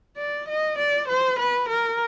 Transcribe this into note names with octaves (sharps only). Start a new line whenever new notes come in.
D5
D#5
D5
C5
B4
A#4